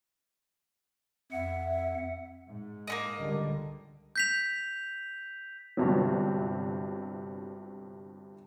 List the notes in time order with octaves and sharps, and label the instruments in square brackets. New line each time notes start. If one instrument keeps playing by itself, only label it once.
[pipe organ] F2 F#5 [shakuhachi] E5
[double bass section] G#2
[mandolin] A#3 B3 D#5
[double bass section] C#2 D3 G3
[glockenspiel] G6 B6 F7
[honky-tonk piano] G1 G2 C3 F#3